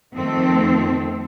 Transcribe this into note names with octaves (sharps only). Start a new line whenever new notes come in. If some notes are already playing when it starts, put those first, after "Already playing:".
F2 D#3 A3 C4 A4